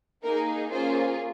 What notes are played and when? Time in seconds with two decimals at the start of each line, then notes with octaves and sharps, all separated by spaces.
0.24 A#3 D#4 G#4 A#4
0.72 A#3 C#4 F4 G#4 C5